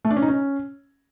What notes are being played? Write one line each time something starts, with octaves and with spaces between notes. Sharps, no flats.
A3
D4
C#4
D#4
C#4